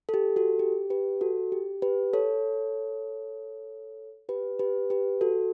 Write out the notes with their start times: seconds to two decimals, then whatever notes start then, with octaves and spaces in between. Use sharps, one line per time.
0.09 A4
0.14 G4
0.36 F#4 A4
0.59 G4
0.90 G4 B4
1.21 F#4 A4
1.52 G4
1.82 G4 B4
2.13 A4 C#5
4.29 G4 B4
4.59 G4 B4
4.90 G4 B4
5.21 F#4 A4